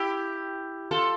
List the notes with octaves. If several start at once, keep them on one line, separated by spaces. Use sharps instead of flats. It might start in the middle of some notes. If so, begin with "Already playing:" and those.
Already playing: E4 G4
F4 A4